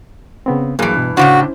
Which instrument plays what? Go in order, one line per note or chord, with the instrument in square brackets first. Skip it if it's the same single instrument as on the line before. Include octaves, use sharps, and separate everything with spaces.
[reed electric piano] C#3 B3 C4
[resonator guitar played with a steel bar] G2 E3 [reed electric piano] F#3 A#3 G#4
[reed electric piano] B2
[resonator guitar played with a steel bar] A2 C#3 D4 [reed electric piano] C#4 E4 C5 [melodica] F#4